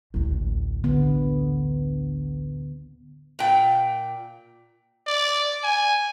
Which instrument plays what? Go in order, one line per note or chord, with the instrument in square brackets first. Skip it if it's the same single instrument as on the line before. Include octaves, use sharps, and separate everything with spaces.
[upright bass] A1 D2
[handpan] D3 B3
[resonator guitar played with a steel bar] A#2 G5
[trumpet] D5
G#5